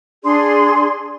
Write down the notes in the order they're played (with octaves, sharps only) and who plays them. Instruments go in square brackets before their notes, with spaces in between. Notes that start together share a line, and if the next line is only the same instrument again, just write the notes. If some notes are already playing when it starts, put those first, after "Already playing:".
[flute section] D4 G#4 D5 C6